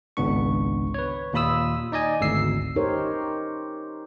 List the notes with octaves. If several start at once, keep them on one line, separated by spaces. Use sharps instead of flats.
G#1 C#2 B3 D4 C#6
B4 C#5
D#2 A#2 F4 B5 D#6 E6
D#4 D5 D#5 G#5
G#1 D2 E6 C7
D#4 G4 A#4 C5 C#5